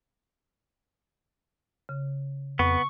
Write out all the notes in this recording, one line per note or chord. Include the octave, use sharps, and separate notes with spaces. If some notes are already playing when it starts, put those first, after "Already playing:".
C#3
F2 B3 C#6